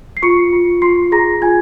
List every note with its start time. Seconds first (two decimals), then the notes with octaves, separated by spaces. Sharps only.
0.17 C7
0.22 F4 C#6 C#7
0.53 F4
0.82 F4 C6 C7
1.12 G#4 A#5 A#6
1.42 F4 G#5 G#6